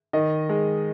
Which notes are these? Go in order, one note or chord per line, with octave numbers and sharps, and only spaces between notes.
D#3 D#5
G#3